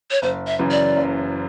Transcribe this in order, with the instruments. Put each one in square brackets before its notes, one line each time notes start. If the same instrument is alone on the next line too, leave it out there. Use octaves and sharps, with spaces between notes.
[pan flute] C#5
[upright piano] F#1 [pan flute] C5
[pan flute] E5
[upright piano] F#2 C#3 E3
[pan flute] D5
[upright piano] F#1